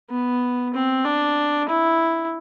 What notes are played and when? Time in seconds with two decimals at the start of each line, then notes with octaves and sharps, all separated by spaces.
0.10 B3
0.74 C4
1.05 D4
1.69 E4